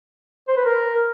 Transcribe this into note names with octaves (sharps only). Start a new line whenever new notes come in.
C5
B4
A#4